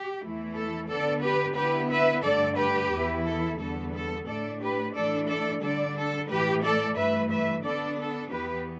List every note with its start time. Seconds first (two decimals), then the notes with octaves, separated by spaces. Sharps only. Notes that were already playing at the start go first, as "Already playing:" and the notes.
Already playing: G4
0.23 E2 E3 A3 E4
0.57 A4
0.89 D3 B3 D4 A4 D5
1.23 G4 B4
1.57 D3 B3 E4 G4 B4
1.92 B4 E5
2.25 G2 D3 A3 A4 D5
2.58 G4 B4
2.93 E2 E3 B3 E4
3.25 A4
3.59 E2 D3 G3 B3 A4
3.93 A4
4.27 A2 A3 D4 A4 D5
4.61 G4 B4
4.94 A2 E3 A3 D4 A4 D5
5.28 A4 D5
5.61 D3 G3 D4 A4 D5
5.96 A4
6.29 A2 E3 A3 G4 B4
6.63 A4 D5
6.96 G2 E3 A3 B4 E5
7.30 B4 E5
7.64 D3 B3 D4 A4 D5
7.98 A4
8.31 E2 E3 B3 G4 B4